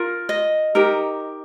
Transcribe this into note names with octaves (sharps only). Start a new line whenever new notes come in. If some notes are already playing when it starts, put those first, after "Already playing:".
Already playing: F4 A#4
D#5
D#4 G4 A#4